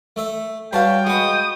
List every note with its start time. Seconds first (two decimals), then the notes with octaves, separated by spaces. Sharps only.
0.16 A3 A4 E5
0.73 G2 F#4 C#5 F5 G5 A5 B5
1.07 G#3 F#4 B4 D#6